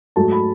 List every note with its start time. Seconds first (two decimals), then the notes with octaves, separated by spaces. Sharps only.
0.16 G#2 F#3 A3 A5
0.32 B5